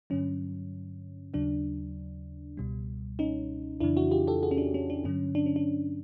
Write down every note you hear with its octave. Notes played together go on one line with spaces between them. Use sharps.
G2 D3 F#3 C#4
D#2 C#3 F#3 D4
C#2 B2 G3
C#4 D#4
F2 C#3 E3 D4 E4
E4 F#4
F4 G4
G4 A4
F#4 G#4
C#4
D4
C#4
D4
G2 D3 F#3 C#4
D4
C#4
D4